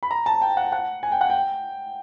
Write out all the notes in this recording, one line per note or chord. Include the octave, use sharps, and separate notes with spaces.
B5
A#5
A5
G5
F#5
F#5
G#5
G5
F#5
G5